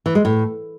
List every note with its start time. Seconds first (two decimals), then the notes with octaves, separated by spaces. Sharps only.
0.06 E3
0.15 G#3
0.25 A2